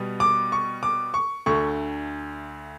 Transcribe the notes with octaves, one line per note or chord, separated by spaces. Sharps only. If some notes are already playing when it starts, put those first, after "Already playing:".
Already playing: B2 G3 B3
D6
C#6
D6
C#6
D2 D3 A3 C#6